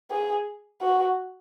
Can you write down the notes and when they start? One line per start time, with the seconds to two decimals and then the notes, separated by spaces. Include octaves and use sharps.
0.10 G#4
0.81 F#4